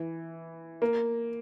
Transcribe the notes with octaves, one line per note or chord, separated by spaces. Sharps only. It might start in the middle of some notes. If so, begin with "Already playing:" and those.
Already playing: E3
A#3